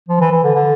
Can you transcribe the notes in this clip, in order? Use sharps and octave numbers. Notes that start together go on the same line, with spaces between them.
F3
E3
E3
D3
D3